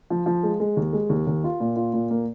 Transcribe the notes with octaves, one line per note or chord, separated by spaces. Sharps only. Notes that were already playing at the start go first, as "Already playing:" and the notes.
F3
F3
G#3
G#3
D#2
G#3
D#2
D#2
F4
A#2
F4
A#2
A#3